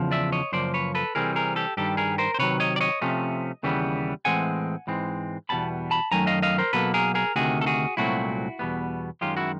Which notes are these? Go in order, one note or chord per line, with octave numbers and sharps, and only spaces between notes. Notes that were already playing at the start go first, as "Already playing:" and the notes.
Already playing: E2 C#3 F3
D5 E5
C#5 D#5
F#2 C#3 F3 A#3 C5 D5
B4 C#5
A4 B4
C3 E3 G3 C4 G#4 A#4
G#4 A#4
G4 A4
G2 D#3 G3 G4 A4
G#4 A#4
A#4 C5
C5
C3 D#3 F#3 B4 C#5
C#5 D#5
D5
C#5 D#5
C3 F3 A3 C#4
D#2 C#3 E3 G3 B3
A2 E3 G#3 C4 F#5 G#5
G#2 E3 G#3 C4
E2 B2 G3 B3 A5 B5
A5 B5
F#2 D#3 F#3 A3 G#5 A#5
D#5 F5
D#5 F5
A#4 C5
B2 F#3 A#3 A4 B4
G#4 A#4
G#4 A#4
D2 C3 D#3 F#4 G#4
A4
F#4 G#4
C2 A#2 F#3 A3 C4 E4 F#4
E2 B2 G3 B3
F#2 D#3 G#3 C#4 F4 G4
E4 F#4